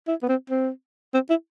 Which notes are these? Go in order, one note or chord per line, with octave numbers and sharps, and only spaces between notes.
E4
B3
C4
C4
C4
E4